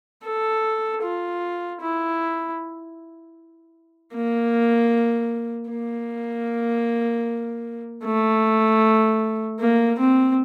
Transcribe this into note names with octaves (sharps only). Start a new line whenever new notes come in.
A4
F4
E4
A#3
A#3
A3
A#3
C4